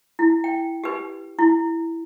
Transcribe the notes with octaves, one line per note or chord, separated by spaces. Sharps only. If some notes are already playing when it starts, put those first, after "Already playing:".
E4
G5
G4 B4
E4